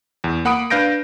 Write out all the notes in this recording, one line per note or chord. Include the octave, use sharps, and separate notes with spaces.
E2
A#3 F#5 B5 D#6 D7
D4 B4 F5 G6 A#6 D7